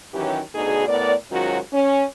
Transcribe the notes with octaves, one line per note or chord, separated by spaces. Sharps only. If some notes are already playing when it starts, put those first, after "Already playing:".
D#3 E3 F#3 C#4 G4
D2 B2 D3 D#4 G#4
A2 B3 A#4 D5
G#2 D#3 F#3 C#4 F4 F#4
C#4